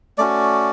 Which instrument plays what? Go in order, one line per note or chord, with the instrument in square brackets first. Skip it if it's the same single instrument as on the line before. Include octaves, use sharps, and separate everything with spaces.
[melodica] A3 C#4 F#4 D5